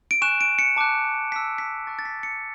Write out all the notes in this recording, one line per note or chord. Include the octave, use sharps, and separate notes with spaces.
D7
G#5 C#6 F#6 E7
D7
C#7
A5 D6 F#6
A5 E6 B6
B6
A5 C#6 F#6 A6
A6
B6
C#7